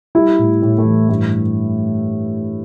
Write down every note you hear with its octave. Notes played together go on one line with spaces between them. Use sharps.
G3 E4
A2
A2
A3
E3
G2 A3